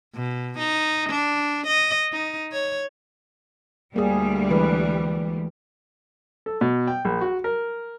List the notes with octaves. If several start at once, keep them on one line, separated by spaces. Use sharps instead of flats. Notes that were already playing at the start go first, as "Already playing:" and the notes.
B2
D#4
D4
D#5
D#4
C#5
D2 G3 A#3 G#4
E3 G#3 B4
A4
B2
G5
A#1
F#4
A#4